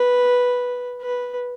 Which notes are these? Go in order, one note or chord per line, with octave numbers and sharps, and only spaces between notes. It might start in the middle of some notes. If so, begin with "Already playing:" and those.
Already playing: B4
B4